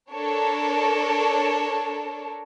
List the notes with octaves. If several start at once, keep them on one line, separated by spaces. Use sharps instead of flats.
D4 A4 A#4 C#5